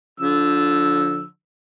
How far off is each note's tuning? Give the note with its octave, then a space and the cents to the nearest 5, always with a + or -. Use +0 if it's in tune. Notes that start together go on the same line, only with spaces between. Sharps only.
D3 -15 F3 +20 E6 -5